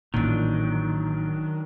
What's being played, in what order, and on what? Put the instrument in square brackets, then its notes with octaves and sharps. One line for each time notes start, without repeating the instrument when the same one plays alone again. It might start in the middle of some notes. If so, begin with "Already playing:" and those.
[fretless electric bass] A1 A#2 [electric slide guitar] D#3 F#3 D4